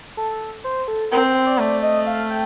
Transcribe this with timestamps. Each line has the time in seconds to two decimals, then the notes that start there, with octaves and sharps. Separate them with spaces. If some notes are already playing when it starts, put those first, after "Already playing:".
0.17 A4
0.64 C5
0.88 A4
1.12 C4 A#4
1.24 C5
1.35 C5
1.47 D5
1.59 A3 D5
1.83 D#5
2.07 F5
2.30 G5